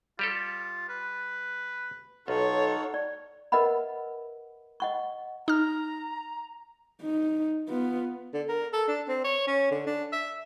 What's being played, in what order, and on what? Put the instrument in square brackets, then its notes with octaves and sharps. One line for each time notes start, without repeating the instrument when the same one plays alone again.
[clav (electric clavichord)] G3 G4 A4 [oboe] F4
[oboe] B4
[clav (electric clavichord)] B1 [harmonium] D#4 A4 F#5 [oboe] F4 [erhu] C#5
[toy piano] D5
A#4 B4 D#5 E5 F#5 B5
D#5 F#5 C#6
[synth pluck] D#4 F6 [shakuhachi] A#5
[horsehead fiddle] D#4
B3 F4
[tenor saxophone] D3
A#4
A4
D4
C4
C#5
C#4
D3
D4
E5